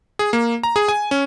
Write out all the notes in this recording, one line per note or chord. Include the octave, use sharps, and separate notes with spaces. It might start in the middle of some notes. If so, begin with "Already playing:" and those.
G#4
A#3
A#5
G#4
G#5
C#4